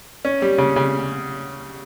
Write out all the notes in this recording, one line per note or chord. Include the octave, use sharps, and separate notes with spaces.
C#4
G3
C#3
C#3